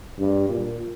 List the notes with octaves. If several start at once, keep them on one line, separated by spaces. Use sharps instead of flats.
G2
A#2